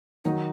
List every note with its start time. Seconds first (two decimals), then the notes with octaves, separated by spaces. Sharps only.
0.25 D#3 F#3 D#4